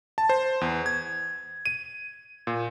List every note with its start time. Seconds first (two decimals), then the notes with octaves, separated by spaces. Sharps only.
0.18 A5
0.29 C5
0.61 E2
0.86 G#6
1.66 D#7
2.47 A#2